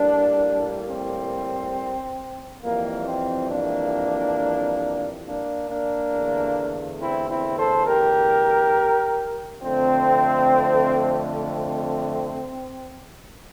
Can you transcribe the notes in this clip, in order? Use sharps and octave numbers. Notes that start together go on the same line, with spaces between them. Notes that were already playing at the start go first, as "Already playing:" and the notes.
Already playing: A2 G3 A#3 D4
C4
F2 E3 G3 A#3
C4
A#3 D4
A#3 D4
A#3 D4
E2 D3 A3
C4 E4
C4 E4
A4 C5
G4 A#4
F2 D3 A3 C4
C4